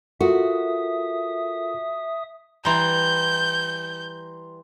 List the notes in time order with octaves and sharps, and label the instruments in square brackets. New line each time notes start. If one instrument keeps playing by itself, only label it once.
[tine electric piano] F4 A4 A#4 [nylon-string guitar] F#4 [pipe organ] E5 D#6
[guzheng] E3 G3 [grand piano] A#5 C6 [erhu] G6